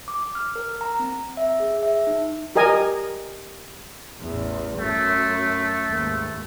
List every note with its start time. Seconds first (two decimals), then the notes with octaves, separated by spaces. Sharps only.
0.08 D6
0.35 F6
0.56 A#4
0.81 A#5
0.99 C4
1.37 E5
1.60 G#4
1.83 E5
2.07 D#4
2.56 G4 A#4 D#5 G#5
4.21 A1 E2
4.78 F#2 A3
5.87 D#2 G#2